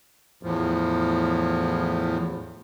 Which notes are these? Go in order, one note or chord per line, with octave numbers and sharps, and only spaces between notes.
E2 A2 F3